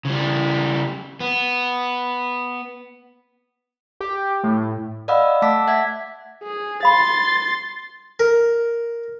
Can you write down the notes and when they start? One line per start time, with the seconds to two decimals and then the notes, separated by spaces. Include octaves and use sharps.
0.05 C#3 G3
1.20 B3
4.01 G4
4.44 A2
5.08 D5 D#5 F5 F#5 B5 E6
5.42 A3 F#5 A5 D6 E6 B6
5.67 E5 F#5 G#6 B6
6.43 G#4
6.83 F5 B5 C6 A6
8.20 A#4